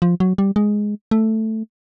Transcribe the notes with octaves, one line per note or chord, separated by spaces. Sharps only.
F3
F#3
G3
G#3
A3